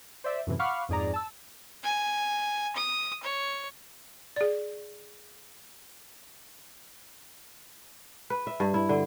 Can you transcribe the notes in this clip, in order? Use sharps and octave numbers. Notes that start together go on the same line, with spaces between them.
C5 D5 E5
F#2 A2 C3 E3
F5 F#5 B5 C#6 D6 F6
F2 G#2 G#4 D5 A#5
A5 E6
G#5
D#6
C#5
G#4 D5
B4
E5
G2
E4
D3